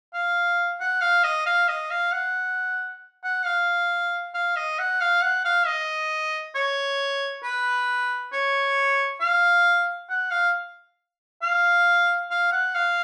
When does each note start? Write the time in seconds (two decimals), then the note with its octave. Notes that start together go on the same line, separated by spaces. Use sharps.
0.14 F5
0.80 F#5
1.01 F5
1.24 D#5
1.46 F5
1.68 D#5
1.90 F5
2.12 F#5
3.24 F#5
3.46 F5
4.34 F5
4.56 D#5
4.78 F#5
5.01 F5
5.22 F#5
5.45 F5
5.66 D#5
6.55 C#5
7.43 B4
8.32 C#5
9.20 F5
10.09 F#5
10.31 F5
11.42 F5
12.31 F5
12.52 F#5
12.75 F5